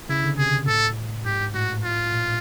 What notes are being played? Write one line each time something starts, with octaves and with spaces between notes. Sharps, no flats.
C#3 E4
D3
C3 G#4
A2 A4
G#2 G4
A2 F#4
F4
A#2